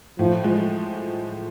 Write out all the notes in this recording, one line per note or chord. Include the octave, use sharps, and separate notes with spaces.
A2 F3
F3 G#3